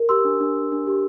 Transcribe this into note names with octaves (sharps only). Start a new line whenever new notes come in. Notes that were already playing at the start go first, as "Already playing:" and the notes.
Already playing: A#4
G4 C6 E6
D4
D4
D4
D4
G4